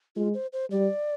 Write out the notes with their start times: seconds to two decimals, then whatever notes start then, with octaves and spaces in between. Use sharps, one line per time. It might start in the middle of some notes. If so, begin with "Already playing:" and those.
0.16 G#3 F4
0.34 C5
0.53 C5
0.71 G3 D5